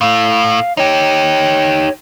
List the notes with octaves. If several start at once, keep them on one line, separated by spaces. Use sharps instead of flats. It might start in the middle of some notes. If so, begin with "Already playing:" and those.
A2 A3 F5
D#4 G4 C#5